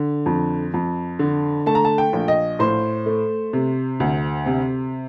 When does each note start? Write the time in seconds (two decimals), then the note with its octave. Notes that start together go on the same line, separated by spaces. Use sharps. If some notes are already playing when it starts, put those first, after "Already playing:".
Already playing: D3
0.26 F2
0.74 F2
1.19 D3
1.66 A3 A5
1.75 A#5
1.85 A5
1.98 G5
2.13 A#1
2.28 D#5
2.59 A2 C5
3.06 A3
3.53 C3
4.00 D2
4.46 C3